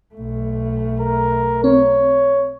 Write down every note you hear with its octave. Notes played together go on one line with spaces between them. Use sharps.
B1 A3
A#4
C4 C#5